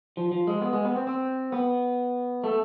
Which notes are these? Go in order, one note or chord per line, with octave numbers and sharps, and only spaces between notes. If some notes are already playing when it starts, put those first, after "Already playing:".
F3
F3
G#3
B3
G#3
B3
C4
C4
B3
A3